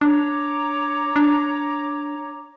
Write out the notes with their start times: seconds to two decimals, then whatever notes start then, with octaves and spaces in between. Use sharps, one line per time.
0.01 D4 C#5 A#5 D6
1.16 D4